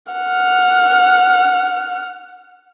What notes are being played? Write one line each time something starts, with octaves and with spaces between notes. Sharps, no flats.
F#5 F6